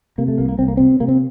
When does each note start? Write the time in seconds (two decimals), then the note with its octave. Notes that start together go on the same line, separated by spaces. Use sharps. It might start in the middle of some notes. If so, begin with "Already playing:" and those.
0.18 C3 A#3
0.28 A3
0.38 C2 A#3
0.49 A#3
0.59 C2 C4
0.68 A#3
0.77 C3 C4
1.00 C3 A#3
1.08 C4